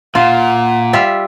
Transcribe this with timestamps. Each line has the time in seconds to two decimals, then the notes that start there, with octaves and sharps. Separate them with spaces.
0.15 A#2 F4 F#5
0.93 G3 F4 E5